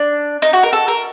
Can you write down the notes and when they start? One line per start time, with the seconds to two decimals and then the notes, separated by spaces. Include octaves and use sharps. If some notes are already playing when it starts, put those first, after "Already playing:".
Already playing: D4
0.42 D#4
0.53 F#4
0.63 A#4
0.73 A4
0.88 A#4